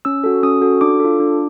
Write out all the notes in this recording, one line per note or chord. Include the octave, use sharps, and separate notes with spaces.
C#4 E6
F#4 A4
C#4 D#6
F#4 A4
D4 D6
F4 A4
D4